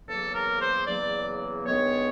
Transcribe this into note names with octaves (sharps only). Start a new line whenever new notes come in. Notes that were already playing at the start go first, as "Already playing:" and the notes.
E2 C#3 F#3 A#3 A4
A#4
C5
E2 C#3 F#3 A#3 D5
G2 D#3 G#3 B3 C#5